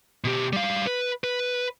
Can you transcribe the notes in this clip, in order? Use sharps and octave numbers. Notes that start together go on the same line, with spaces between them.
B2 G4
G3 F5
B4
B4